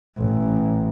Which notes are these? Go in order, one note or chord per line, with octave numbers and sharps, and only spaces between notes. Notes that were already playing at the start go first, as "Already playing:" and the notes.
A1